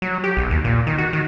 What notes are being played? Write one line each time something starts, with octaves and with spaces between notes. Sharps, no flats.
F#3
G4
B1
D#2
A#2
D#3
F#4
D#3